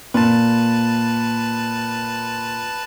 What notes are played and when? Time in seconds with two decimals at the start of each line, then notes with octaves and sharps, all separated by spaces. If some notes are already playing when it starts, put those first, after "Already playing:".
0.14 A#2 B4 A5